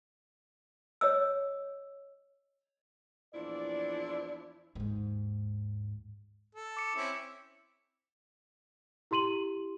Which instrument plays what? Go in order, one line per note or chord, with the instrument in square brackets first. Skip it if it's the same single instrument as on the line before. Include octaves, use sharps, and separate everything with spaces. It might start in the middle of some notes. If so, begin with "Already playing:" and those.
[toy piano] C#5 D#5 E6
[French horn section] E2 A#2 D5 [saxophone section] F3 D4 E4
[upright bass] D#2 G#2
[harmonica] A4
[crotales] D6 C#7
[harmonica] C4 C#4 E4
[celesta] E4 G4 C6 D#7 F#7